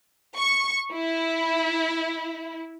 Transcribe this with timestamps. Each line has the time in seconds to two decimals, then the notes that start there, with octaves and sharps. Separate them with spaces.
0.36 C#6
0.92 E4